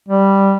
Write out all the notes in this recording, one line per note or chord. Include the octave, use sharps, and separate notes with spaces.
G3